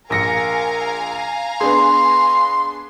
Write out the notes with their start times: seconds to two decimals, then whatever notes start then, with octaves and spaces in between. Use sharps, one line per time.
0.10 A#1 A#4 F5 G#5 A#5 A#6 C#7
1.61 B3 D4 G#4 C6